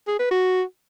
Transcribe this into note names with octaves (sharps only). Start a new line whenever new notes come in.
G#4
B4
F#4